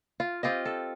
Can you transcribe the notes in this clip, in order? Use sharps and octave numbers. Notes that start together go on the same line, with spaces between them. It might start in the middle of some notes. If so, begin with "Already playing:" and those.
F4
C4 F4 G4 D#5
A4